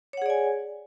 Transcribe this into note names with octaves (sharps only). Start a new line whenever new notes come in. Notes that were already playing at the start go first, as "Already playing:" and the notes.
G#4 C#5 D5 F#5 G#5